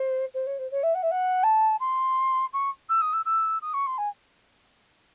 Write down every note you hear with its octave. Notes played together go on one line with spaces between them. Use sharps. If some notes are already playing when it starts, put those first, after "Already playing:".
Already playing: C5
C5
C#5
C5
C#5
E5
F#5
E5
F#5
A5
C6
C#6
E6
D#6
E6
E6
D#6
C#6
C6
G#5